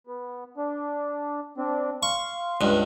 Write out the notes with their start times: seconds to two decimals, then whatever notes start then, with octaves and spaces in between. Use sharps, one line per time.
0.07 B3
0.57 D4
1.57 C4 D4
2.03 F5 C6 C#6
2.61 C#2 G2